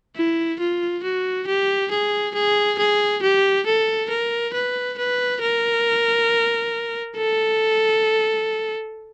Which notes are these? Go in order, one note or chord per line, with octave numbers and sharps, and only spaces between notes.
E4
F4
F#4
G4
G#4
G#4
G#4
G4
A4
A#4
B4
B4
A#4
A4